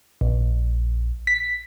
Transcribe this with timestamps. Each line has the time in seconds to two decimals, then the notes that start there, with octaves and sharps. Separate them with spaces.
0.21 A#1
1.27 B6